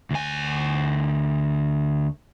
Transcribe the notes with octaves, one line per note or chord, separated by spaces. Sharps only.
D2 G#5